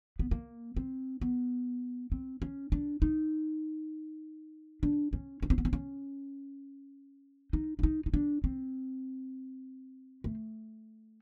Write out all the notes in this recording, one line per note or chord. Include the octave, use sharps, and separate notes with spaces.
B3
A#3
C4
B3
C4
C#4
D4
D#4
D4
C#4
C#4
C4
B3
C4
C#4
D#4
D4
D#4
D#4
D4
C4
A3